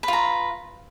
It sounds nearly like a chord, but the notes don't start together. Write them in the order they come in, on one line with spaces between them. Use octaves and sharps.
B4 F4 A#5